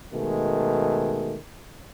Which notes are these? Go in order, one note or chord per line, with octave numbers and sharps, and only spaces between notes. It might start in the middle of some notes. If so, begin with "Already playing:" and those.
B2 D#3 G#3 A3